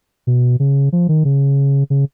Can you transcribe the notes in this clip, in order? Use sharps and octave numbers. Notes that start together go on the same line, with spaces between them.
B2
C#3
F3
D#3
C#3
C#3